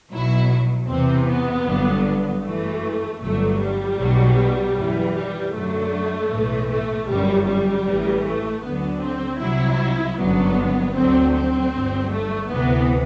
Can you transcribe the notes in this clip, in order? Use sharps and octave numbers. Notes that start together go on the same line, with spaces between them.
B1 B2 F#3 E4
E2 C3 E3 C4
B3
G1 G2 D3 F#3
B3
F#2 E3 A3
G1 G2 F#3 A3
G3
B1 B2 F#3
F#2 E3
G3
F#2 D3 F#3 A3
B1 A2 E3
A3
G1 F#2 F#3 G3
G3
A1 A2 E3
A3
D2 D3 F#3 B3
C4
C2 C3 F#3 E4
G1 F#2 D3 F#3 B3
D2 D3 F#3 C4
C4
G1 G2 F#3
A3
D2 C3 E3 B3